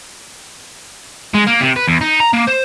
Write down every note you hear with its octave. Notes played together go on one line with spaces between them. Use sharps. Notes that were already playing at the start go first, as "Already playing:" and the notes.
G#3
A#3
C3
B4
E2
D#4
A#5
A#3
C5